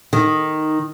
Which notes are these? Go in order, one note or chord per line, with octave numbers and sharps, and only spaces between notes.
D#3